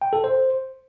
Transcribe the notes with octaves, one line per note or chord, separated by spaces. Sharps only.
G5
A4
C5